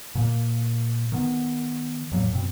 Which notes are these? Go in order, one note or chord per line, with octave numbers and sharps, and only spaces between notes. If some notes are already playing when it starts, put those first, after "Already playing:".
A#2 A#3
D#3 B3
E2 A2 F#3 A#3
F#2 B2 C4